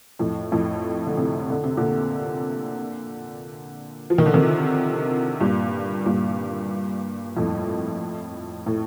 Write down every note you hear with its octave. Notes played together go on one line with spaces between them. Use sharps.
F2 A2
F2 A2
D3
A2 C3
D3
C3
A#2 D3
F3
D#3
D3
C3 D#3
G2 A#2
G2 A#2
F2 A2
A2